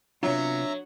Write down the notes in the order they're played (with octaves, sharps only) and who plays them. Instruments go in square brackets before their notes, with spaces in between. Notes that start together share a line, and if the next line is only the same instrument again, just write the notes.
[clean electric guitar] C3 B3 F4 [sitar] F#3 [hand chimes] D4 [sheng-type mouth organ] E5 A#5